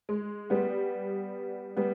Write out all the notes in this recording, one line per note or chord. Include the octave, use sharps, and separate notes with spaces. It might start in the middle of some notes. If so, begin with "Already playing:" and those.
G#3
G3 B3
G3 B3